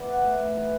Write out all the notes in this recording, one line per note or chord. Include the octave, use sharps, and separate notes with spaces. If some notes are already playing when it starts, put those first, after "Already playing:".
Already playing: E3 B3 B4 D5
F#5
A3 E5
D5
E3 B4